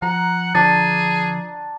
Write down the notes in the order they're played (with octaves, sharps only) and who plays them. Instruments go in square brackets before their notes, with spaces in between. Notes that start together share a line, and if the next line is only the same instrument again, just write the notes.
[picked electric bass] F3 [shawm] F#5 [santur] A#5
[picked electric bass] D3 F3 [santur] D4 [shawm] G#4 [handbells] A6